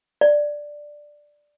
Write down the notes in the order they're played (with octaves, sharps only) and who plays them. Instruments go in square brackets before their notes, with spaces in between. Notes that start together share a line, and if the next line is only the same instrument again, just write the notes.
[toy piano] D5